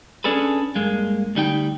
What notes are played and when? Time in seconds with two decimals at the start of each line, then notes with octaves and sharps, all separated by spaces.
0.24 C#4 D4 G#4 A4 B4
0.75 G2 G#3 A#3
1.35 D2 G3 D#4 G5